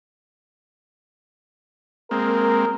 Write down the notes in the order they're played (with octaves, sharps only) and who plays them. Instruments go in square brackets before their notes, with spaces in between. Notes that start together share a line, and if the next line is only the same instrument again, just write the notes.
[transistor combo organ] G#3 A#3 C4 [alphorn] A#4